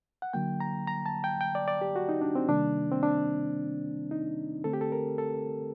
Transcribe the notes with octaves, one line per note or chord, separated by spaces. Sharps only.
F#5
D3 F#3 A#3 G5
A#5
A#5
A5
G5
G5
D5
D5
G4
F#4
D#4
D4
C4
C3 D#3 G3 A#3 D4
C4
D4
D#4
D3 A3 C4 A4
G4
A4
A#4
A4